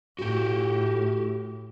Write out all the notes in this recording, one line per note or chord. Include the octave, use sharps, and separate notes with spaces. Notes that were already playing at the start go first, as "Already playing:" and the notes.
A2 F#4 G4